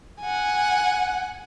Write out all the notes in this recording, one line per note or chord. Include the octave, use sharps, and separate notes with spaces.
F#5 G#5